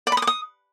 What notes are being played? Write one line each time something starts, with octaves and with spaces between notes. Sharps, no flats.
D5
B5
D#6
D6
D#6